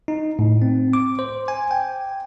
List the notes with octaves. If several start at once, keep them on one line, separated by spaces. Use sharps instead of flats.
D#4
A2
C4
D6
C5
G#5
G5